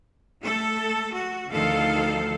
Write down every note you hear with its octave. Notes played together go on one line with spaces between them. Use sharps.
A3 A4
F#4
D2 D#3 F3 A4 F5